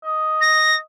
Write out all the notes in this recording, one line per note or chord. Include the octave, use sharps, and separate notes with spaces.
D#5
A#6